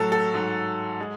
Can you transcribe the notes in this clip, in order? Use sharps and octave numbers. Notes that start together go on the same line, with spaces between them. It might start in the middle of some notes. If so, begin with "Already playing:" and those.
Already playing: A2 F#3 A4
A4
G#2 F#3
G#3